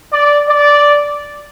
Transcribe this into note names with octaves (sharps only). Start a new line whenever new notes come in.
D5
D5